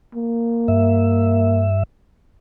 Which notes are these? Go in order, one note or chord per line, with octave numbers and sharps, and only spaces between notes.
A#3
G2 E5